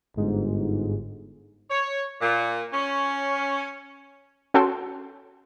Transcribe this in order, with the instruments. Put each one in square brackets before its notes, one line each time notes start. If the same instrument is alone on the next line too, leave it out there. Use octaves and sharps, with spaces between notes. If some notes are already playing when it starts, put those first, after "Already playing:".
[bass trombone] G1 [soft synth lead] G#2
[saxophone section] C#5
A#2
C#4
[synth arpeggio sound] C#4 F#4 A4 G5 A5 C6